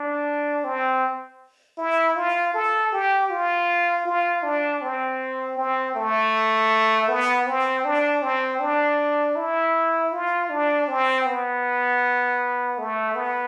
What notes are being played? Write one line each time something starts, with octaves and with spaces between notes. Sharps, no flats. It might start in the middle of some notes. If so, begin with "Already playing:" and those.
Already playing: D4
C4
E4
F4
A4
G4
F4
F4
D4
C4
C4
A3
B3
C4
D4
C4
D4
E4
F4
D4
C4
B3
A3
B3